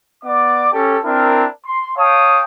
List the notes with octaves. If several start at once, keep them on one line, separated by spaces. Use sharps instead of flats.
B3 D5 D6
C#4 G4 A4
C4 D4 E4 A#4
C6
C#5 F5 G5 A5 D#6